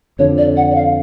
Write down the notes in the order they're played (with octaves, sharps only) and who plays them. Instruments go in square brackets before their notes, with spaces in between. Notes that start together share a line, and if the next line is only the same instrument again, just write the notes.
[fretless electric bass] F2 D3 F3 [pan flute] C#5
[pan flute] D5
F#5
D5
F5